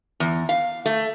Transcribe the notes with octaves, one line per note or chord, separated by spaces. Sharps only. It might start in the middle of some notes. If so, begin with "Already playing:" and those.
E2
F5
A3